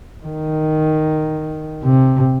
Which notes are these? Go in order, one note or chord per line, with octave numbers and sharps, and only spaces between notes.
D#3
C3